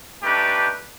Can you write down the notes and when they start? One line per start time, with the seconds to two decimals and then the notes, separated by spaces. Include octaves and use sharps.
0.24 A3 D4 D#4 G4 B4